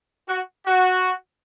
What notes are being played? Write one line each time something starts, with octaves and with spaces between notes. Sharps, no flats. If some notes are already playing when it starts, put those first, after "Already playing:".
F#4
F#4